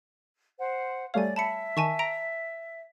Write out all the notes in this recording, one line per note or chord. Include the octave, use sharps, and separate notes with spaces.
C5 F#5
G3 A3 C#5 D5 F5 G#5
E5 A5 B5 C#7
D#3 G#5 A5 C#6 B6
A#5 D7 F7